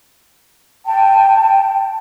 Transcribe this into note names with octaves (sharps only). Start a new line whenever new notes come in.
G5 A5